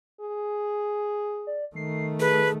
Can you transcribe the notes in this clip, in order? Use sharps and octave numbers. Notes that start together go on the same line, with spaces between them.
G#4
D5
D#3 A3 C7
G#4 A4 B4